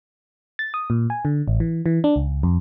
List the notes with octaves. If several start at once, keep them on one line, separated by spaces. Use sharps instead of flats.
A6
D#6
A#2
G#5
D3
A1
E3
E3
D4
C#2
F2